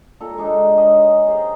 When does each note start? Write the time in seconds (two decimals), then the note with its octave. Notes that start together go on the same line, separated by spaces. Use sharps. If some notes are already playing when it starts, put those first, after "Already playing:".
0.20 A#2 A4 A#4
0.38 G#3 D4 D#4
0.77 G#4 C#5 D#5
1.27 G4 G#4 A#4 C5